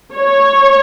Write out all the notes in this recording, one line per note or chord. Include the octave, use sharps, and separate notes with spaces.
C#5